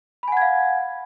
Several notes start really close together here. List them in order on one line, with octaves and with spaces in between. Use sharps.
B5 G#5 F#5 G#6 F5